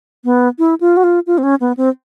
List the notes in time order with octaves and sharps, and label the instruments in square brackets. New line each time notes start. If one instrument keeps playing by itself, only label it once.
[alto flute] B3
E4
F4
F#4
F4
F4
C4
C#4
B3
C4